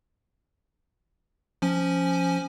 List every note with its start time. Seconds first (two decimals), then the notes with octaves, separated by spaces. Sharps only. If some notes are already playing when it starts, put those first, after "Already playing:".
1.62 F3 C#4 G#5